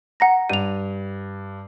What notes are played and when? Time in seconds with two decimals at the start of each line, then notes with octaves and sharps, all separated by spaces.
0.20 F#5 A#5 A#6
0.50 G2 D#7 F7